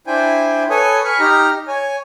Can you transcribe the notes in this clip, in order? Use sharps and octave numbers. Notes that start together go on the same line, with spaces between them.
D4 E4 C5 G5 G#5
A4 B4 C#5 G#5 D#6
G#5 B5 C#6 F6
D#4 G4 A#5 F6
C#5 G#5